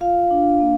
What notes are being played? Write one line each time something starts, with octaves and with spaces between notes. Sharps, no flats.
F4 F5
D4
A#3